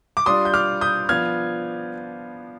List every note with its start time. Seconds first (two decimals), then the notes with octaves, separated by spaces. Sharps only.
0.17 D6
0.26 G3 D4 F4 C6 D#6
0.45 G6
0.54 D6 F6
0.81 D#6 G6
1.09 F3 B3 D4 F4 F6 G#6